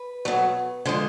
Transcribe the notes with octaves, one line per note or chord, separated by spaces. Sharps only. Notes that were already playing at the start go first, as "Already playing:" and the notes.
Already playing: B4
B2 F#3 A3
D3 F3 G#3 C5